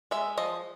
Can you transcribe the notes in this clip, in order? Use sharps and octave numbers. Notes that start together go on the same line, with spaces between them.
G#3 E5
F3 D#5